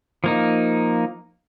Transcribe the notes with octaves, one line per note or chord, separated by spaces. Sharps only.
F3 A#3 D#4